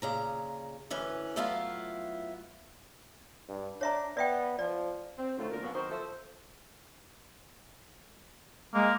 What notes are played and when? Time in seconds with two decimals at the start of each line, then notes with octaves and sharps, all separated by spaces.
0.02 A#2 C#3 A#5
0.91 D2 E3 C#4 B4
1.36 F#3 A3 B3 E4 F4 F5
3.49 G2
3.81 D4 C#5 E5 A#5
4.17 B3 D5 E5 G5
4.59 F3 D5
5.18 C4
5.38 A2 D3 D#3 F#3 A3 F4
5.51 D2 A#2 A#4
5.63 B2 F#3 A#3 B3 C#4
5.75 D#3 F#3 C4 F#4 C5
5.91 F3 A4 C5 E5
8.74 G#3 A#3